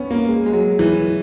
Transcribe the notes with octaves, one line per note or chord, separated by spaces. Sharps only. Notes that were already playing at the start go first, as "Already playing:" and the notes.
Already playing: B3 C#4
A#3
G#3
G#3
F#3
E3